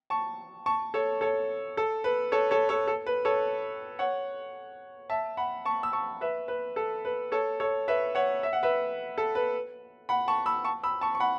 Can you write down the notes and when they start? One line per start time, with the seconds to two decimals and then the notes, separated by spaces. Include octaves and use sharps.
0.10 A5 C#6
0.66 A5 C#6
0.94 A4 C#5
1.21 A4 C#5
1.77 A4
2.04 B4
2.32 A4 C#5
2.51 A4 C#5
2.69 A4 C#5
2.88 A4
3.07 B4
3.25 A4 C#5
3.99 C#5 F#5
5.10 E5 A5
5.37 F#5 B5
5.65 A5 C#6
5.83 E6
5.93 A5 C#6
6.21 B4 E5
6.48 B4
6.76 A4
7.05 B4
7.32 A4 C#5
7.60 A4 C#5
7.88 B4 E5
8.15 C#5 F#5
8.43 E5
8.53 F#5
8.63 B4 E5
9.18 A4
9.35 B4
10.09 F#5 B5
10.28 A5 C#6
10.46 B5 E6
10.65 A5 C#6
10.84 B5 E6
11.01 A5 C#6
11.15 C#6
11.20 F#5 B5